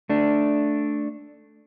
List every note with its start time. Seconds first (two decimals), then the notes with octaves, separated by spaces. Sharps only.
0.10 A3 D4